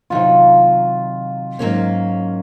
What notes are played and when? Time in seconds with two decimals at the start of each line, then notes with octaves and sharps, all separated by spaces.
0.10 C3 D#3 F#3 F4
1.59 G#2 F#3 A#3 C#4